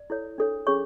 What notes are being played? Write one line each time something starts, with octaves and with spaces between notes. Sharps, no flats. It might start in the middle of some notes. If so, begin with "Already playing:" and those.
Already playing: D5
E4 A4 C#5
D4 A4 C#5
C#4 G#4 C#5 C#6